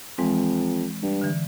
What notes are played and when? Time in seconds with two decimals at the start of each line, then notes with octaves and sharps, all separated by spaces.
0.18 F2 E3 G#3 C4
1.03 G2
1.21 D3 E3